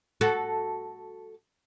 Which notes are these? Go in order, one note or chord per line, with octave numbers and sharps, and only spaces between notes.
F#4 A4